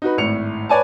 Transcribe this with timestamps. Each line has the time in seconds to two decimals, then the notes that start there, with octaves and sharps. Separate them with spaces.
0.02 D#4 F#4 B4
0.18 G#1 A2 C#7 F7
0.69 B4 C#5 D5 G#5 A5